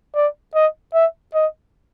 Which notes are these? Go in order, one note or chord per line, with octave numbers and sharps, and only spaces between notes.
D5
D#5
E5
D#5